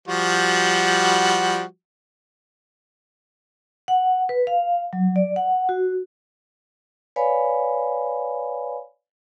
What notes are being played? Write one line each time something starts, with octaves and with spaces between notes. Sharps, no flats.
F3 G3 F#4
F#5
B4
F5
F#3
D5
F#5
F#4
B4 C#5 D5 F5 G#5 B5